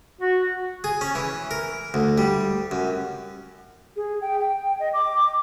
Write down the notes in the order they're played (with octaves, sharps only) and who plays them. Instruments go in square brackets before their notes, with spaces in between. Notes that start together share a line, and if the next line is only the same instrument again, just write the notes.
[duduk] F#4
[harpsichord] G#4
C#4
E3
A#4
D2
G3
F#2
[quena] G#4
G5
G5
D#5
D6